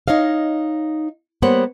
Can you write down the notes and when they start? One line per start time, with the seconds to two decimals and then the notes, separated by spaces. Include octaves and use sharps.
0.08 D#4 C#5 D#5 F5
1.42 G3 A#3 B3 C5 C#5 F#5